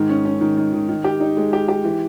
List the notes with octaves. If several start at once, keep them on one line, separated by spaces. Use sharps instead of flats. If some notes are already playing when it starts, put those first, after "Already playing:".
Already playing: G#2 D#3
C#4
C#4
D#3
D#3
D#3
D#3
G4
D#4
G#3
G4
G4
E3